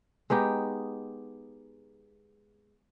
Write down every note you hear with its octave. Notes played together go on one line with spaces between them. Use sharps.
G#3 B3 D#4 G4